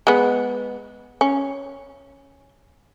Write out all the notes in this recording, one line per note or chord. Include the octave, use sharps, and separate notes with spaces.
G#3 B3
C#4